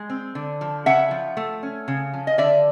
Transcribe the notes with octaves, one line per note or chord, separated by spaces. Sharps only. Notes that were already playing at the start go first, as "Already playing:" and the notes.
Already playing: G#3
C4
D3
F3
C#3 E5 F#5
F3
A3
C#4
C#3
F3
D#5
D3 D5 E5